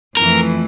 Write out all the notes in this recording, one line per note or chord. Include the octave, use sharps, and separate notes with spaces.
F2 E3 A3 A#4